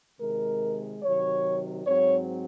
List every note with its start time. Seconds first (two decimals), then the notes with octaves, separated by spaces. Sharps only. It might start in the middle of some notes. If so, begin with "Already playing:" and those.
0.21 C3 D#3 G#3 A#4
1.03 C3 D#3 F#3 C#5
1.86 G#2 F#3 C4 C#5